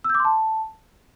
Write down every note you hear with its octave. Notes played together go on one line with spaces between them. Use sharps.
E6
G6
D6
C6
A5